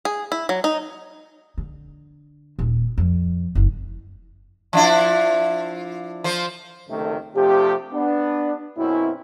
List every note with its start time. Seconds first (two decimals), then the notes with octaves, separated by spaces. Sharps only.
0.05 G#4
0.32 E4
0.49 F#3
0.64 D#4
1.58 D3
2.59 D#1
2.98 F2
3.55 F#1
4.73 F3 D4 E4
6.24 F3 C5
6.89 C#2 F#2 A2 C3 D#3 A3
7.35 C3 F3 A3 D4 G4
7.93 B3 D4
8.77 F#2 B2 C4 C#4 E4